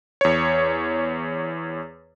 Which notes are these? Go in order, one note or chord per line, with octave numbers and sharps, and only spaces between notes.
E2 C#5